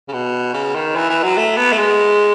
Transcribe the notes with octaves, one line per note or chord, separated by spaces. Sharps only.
C#3
B2
C#3
D#3
E3
E3
F#3
A3
B3
A3
G#3